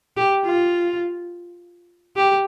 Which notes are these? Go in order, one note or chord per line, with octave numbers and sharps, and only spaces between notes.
G4
F4
G4